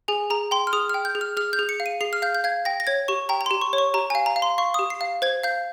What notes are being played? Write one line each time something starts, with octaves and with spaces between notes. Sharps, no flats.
G#4 G#5
G#4 A#5
G5 C6
F6
G#4 D#6
F6
G5
G6
G#4
F6
G#4 F6
G6
G#4
C#7
F5
D#7
G#4 C7
F6
F5 G6
G6
F5 G#6
G5 A#6
A#6
C#5 G#6
G4 C#6
G5 A#5
A#5
C6
G4
C#6
C#5
C#6
G4 A#5
G#5
F5
A#5
F5
C6
F5 C#6
D#6
G4
C7
F5
C5 G#6
F5 G6